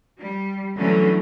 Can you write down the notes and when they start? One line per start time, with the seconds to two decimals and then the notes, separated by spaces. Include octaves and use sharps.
0.20 G3
0.77 D3 E3 F#3 A3 C#4